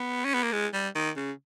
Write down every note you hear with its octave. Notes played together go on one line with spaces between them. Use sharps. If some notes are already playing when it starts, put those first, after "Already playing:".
Already playing: B3
C#4
B3
A#3
G#3
G3
D#3
C#3